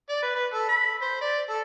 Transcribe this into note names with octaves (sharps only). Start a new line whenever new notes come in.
D5
B4
B4
A4
B5
C5
D5
A4